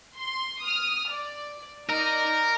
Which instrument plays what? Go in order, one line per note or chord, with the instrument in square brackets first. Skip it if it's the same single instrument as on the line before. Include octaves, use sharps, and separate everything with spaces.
[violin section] C6
D#6 F6
D5
[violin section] D#4 D5 D#5 [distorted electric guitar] A#4